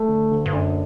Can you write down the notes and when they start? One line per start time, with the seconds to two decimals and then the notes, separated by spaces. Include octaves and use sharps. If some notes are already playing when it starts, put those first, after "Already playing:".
Already playing: A3
0.08 D3
0.31 D2
0.46 G2
0.53 F#2 D4